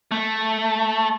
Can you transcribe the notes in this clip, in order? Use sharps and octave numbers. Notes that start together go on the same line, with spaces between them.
A3